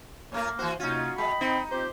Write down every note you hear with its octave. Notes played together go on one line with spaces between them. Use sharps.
A#2 A3 A#3 A#4 C#5
E3 F#4 C5
C3 A#3 C#4 D#4 F4 F#4
G#3 D#5 G5 B5
C4 D#4
C4 F4 G4 C5